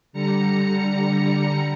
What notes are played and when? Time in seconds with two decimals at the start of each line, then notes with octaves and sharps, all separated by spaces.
0.13 D3 G3 A#5 C#7